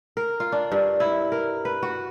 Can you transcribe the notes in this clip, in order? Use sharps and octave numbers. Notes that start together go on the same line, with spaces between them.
A#4
F4
D4
G2
E4
A#4
B4
F#4